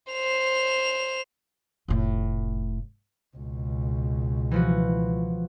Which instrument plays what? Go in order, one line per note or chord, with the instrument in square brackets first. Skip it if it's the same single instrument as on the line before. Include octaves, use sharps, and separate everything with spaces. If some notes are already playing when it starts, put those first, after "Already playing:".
[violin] C5 F7
[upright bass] F1 A2
[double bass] C#2 B2
[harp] E3 F3 F#4